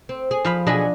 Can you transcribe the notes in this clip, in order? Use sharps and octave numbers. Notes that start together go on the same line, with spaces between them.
C4
G#4
F3 F5 B5
B2 F#3 D4 G#4 D#5 B5